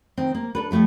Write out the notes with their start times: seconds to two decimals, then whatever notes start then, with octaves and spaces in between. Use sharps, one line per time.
0.18 D#3 C4
0.35 A#3
0.55 D4 A4 B4
0.71 F3 G3 A3 E4 B4